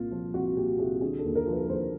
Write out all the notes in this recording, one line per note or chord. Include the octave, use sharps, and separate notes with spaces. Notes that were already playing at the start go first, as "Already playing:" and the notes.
Already playing: C2 A#2 F4
F3
C2 F#4
A#2 G4
C2 G#4
D3 G#4
A4
D#2
A#4
F3
B4
D#2 C5